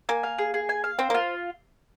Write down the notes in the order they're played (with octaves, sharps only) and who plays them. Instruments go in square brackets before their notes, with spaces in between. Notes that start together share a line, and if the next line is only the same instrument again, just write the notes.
[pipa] A#3 [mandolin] G#5
[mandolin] F5
G#4
G#4
G#5
F5
[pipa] C4 [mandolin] C5
[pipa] A#3
[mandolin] F4